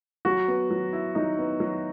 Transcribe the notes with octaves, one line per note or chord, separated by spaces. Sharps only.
F#3 F#4
B3
F#3
E4
F#3 D#4
B3
F#3